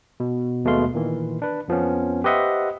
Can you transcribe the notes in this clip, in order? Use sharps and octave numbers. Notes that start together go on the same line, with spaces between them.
B2
D#2 B2 G#3 A3 F5 C6
A#2 D#3 E3
D4 B4
F2 F3 B3 C#4
G4 B4 C5 D#5 E5 F#5